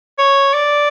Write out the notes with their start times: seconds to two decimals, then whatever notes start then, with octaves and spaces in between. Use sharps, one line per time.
0.18 C#5
0.54 D5